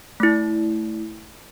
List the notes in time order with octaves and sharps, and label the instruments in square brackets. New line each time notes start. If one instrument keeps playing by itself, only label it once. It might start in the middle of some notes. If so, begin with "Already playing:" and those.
[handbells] A3 E4